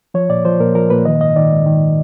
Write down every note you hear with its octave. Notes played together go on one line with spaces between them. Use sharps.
F3 C#5
A#2 D5
F3 C5
A#2 A#4
F3 A#4
A#2 B4
D#3 D#5
G#2 D#5
D#3 D5
G#2
D#3